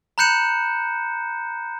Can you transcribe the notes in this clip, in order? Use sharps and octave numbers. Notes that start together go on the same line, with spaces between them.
A#5 B5 F#6 G6 C#7 E7